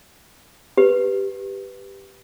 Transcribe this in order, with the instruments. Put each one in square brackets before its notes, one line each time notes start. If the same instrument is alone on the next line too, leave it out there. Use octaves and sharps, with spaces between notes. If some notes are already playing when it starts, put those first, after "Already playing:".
[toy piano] G4 B4